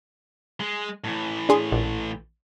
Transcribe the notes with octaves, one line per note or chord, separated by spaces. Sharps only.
G#3
A2 E3
D4 G#4 C6
A#1